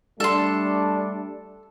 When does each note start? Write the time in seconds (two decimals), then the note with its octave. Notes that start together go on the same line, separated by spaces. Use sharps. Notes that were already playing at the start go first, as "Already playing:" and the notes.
0.20 G3 A3 D4 A4 C6